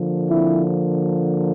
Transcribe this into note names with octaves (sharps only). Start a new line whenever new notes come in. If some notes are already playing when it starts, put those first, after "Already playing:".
Already playing: D3 F3 A#3
C4 E4